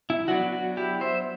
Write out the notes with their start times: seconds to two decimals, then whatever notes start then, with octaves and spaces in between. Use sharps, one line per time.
0.10 E4
0.28 F#3 B3 D4 F#4
0.53 F#4
0.77 E4 G4
1.01 C5 E5